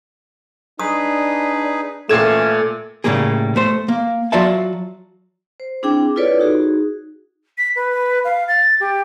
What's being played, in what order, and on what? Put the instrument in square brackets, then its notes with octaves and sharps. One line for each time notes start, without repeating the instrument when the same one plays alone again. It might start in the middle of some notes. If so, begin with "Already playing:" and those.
[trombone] D4 [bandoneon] D#4 G#4 B4 [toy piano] D#6
[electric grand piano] A#2 G#6 E7 [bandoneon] E3 C#4 [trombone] A3 [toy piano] A4 G5
[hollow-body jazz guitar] A2 C#3 G3 G#3 A#3 G#4
A3 C5
A#3
F#3 F4 F#4 D5 E5 A5
[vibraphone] C5
C4 D4 E4 G#4 G5 D6
E4 F4 A4 B4 C#5 D5
D#4 F#4 G#4
[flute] B6
B4
F5
A6
G4